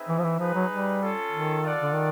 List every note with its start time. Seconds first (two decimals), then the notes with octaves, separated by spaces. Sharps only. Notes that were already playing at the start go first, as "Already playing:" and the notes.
Already playing: C4 D#4 G#4 B4 E5
0.08 E3
0.18 F3
0.24 E3
0.39 F3 D#4 G#4 B4
0.54 F#3
0.70 G3
1.01 C#4 F4 A4
1.31 D#3
1.61 F4 A4 D5 F#5
1.81 D3
1.93 D#3